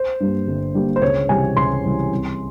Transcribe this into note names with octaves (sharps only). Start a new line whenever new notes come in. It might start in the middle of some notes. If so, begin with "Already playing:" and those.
Already playing: C5
G2 G3 A#3
G1
G2 G3 A#3
C5
C#2 C#5
C3 E3 G3 G#5
C#2 C6
C3 E3 G3
C2